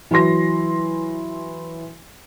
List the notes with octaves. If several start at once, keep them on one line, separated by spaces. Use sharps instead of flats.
E3 F#3 E4 C6 A#6